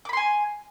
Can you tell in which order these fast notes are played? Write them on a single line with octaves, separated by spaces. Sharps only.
D6 B5 C6 G#5